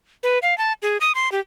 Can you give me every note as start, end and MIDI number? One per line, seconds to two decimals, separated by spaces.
0.23 0.39 71
0.42 0.57 77
0.58 0.73 81
0.82 0.97 68
1.01 1.12 87
1.15 1.31 84
1.32 1.40 67